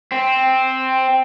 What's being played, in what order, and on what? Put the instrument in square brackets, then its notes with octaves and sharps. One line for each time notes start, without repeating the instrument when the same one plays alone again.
[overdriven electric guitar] C4